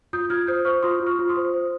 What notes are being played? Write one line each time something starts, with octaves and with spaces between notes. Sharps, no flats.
F4 D#6 G6
F4 F6 G#6
C5 D#6 G6
C5 C#6 F6
F4 C6 D#6
F4
C#6 F6
F4
C6 D#6
C5
C5